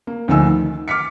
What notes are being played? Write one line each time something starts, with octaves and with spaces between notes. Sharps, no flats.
A#3
D2 F3 D#4 G#5 E6
D#3
D6 F6 B6 C#7